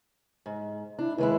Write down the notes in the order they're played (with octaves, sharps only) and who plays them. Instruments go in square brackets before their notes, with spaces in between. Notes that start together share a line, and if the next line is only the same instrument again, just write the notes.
[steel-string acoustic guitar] G#2
[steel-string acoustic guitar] D4 [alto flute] E4
[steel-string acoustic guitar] D#2 G#3 E4 [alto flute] B4